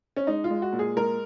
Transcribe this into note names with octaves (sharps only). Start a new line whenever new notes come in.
C#4
G#3 D#4
F4
G#3
F#4
A#2
G#4
G#3 A#4